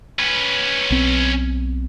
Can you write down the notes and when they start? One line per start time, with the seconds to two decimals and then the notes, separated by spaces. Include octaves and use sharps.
0.19 C#4 B4
0.90 B1 C4